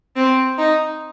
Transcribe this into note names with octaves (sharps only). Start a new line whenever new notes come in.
C4
D#4